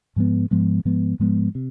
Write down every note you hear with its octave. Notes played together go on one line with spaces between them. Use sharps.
G#2 F3 G#3 B3
G#2 F3 G#3 B3
G#2 F3 G#3 B3
G#2 F3 G#3 B3
C3